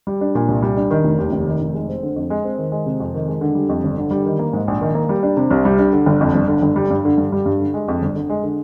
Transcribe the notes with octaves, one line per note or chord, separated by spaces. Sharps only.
G3
D4
A#2
C2
G3
D4
D#3
F1
D#2
F1
D#3
F1
G#3
C4
D3
F2
G#3
C4
D#3
G#3
C3
F2
D#3
G#3
D3
G3
F2
G1
D3
G3
D#3
A#3
G#2
A#1
D#3
A#3
G3
D4
C3
C2
G3
D4
D3
G1
F2
G1
D3
G1
G3
G2
D3
G2
G3
G2
D3
G#3
F2
G1
D3
G#3
D3